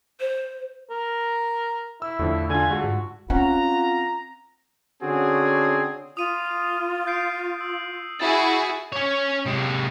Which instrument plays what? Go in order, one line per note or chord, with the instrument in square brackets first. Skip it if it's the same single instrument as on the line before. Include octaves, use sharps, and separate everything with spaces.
[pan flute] C5
[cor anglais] A#4
[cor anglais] E4 [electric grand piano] E6
[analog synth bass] E2 [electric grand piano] A2 D3 F3
[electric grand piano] D3 F4 [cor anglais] G#5
[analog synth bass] G#3 [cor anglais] F#4
[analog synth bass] G#2
[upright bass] C4 [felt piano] C#4 F#5 [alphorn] F4 [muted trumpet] A#5
[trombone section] D3 C#4 F#4 [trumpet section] C4 G#4
[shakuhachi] F4 [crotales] D#6 D#7
[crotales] G6 C7 D7
E6
[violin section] E4 F#4 G#4 [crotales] A6
[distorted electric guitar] C#4 C#5
C3 G#3